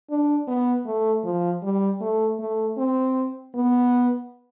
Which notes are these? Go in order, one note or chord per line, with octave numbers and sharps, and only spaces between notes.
D4
B3
A3
F3
G3
A3
A3
C4
B3